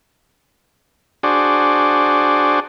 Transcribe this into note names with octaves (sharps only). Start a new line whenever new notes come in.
D4 F#4 G#4 C5 D5